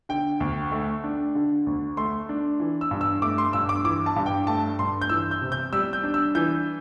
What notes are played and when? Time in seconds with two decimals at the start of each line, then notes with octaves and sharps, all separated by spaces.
0.09 D3 G5
0.40 D2
0.72 A3
1.04 D4
1.35 D3
1.67 D2
1.97 A3 C6
2.29 D4
2.60 E3
2.81 E6
2.91 G2
3.01 E6
3.22 A3 D6
3.38 C6
3.53 G2 E6
3.69 D6
3.84 E3 D6
4.06 A5
4.16 G2
4.26 G5
4.47 A3 A5
4.79 G2 C6
5.02 G6
5.09 E3 E6
5.31 G6
5.41 C3
5.52 G6
5.73 G3 E6
5.93 G6
6.03 D4
6.14 E6
6.35 E3 G6